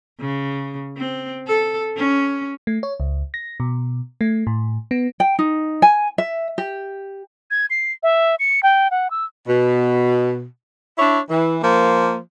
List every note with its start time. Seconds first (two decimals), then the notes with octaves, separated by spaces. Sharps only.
0.20 C#3
0.97 C4
1.47 A4
1.97 C#4
2.67 A3
2.83 C#5
3.00 C#2
3.34 A#6
3.60 B2
4.21 A3
4.47 A2
4.91 B3
5.20 G5
5.39 D#4
5.82 G#5
6.18 E5
6.58 G4
7.51 G#6
7.70 C7
8.03 E5
8.39 C#7
8.63 G5
8.91 F#5
9.10 E6
9.48 B2
10.98 D4 E4 C#5
11.30 E3
11.62 F3 A#3